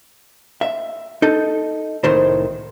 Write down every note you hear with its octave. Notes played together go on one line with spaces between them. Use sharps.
E5
D#4 A4
C2 A2 D#3 C5